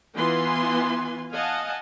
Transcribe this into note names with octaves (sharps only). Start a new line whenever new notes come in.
E3 B3 F4 B4 G#5 C6
D#5 F5 F#5 G#5 A5